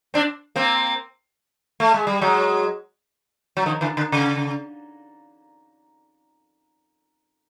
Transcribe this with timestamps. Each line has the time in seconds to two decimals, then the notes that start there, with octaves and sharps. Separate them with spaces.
0.14 C4 D4
0.56 A#3 C4
1.80 A3
1.94 G#3
2.07 G3
2.21 F#3 G#3
3.57 F#3
3.66 D#3 F3
3.81 D3 E3
3.97 D3
4.12 C#3